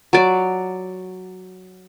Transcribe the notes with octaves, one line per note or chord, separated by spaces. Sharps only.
F#3 D5